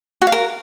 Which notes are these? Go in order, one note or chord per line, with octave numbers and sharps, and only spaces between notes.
F#4
F5
A#4